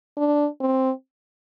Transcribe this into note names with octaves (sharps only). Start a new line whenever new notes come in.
D4
C4